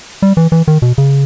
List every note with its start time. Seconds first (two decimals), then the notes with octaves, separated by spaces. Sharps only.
0.22 G3
0.37 E3
0.52 E3
0.68 D#3
0.82 B2
0.98 C#3